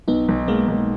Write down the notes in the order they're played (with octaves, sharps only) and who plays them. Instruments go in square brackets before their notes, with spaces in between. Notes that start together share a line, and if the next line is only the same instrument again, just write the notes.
[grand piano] B1 [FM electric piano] B3 D#4
[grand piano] B1
[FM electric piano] G#3 B3 [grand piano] A#3
[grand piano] B1